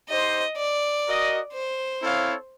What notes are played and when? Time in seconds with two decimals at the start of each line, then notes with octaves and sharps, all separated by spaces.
0.09 D#4 G4 C5 D#5
0.57 D5
1.06 F#4 A#4 D#5
1.53 C5
2.01 C4 E4 A4 C#5 F5